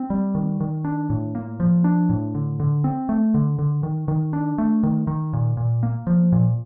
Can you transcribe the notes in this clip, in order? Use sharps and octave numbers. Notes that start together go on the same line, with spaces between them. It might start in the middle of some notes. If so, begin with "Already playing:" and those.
Already playing: C4
G3
D#3
D#3
D4
A2
A#3
F3
D4
A2
D3
D3
C4
A3
D3
D3
D#3
D#3
D4
A3
D#3
D#3
A#2
A#2
A#3
F3
A#2